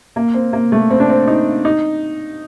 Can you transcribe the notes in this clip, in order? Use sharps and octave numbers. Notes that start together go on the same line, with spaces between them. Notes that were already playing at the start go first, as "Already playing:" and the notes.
A#3
C4
A#3
A3
C4
D4
C4
D#4
D#4